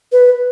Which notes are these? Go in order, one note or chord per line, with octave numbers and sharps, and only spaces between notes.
B4